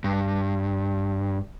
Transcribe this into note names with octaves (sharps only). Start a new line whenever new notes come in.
G2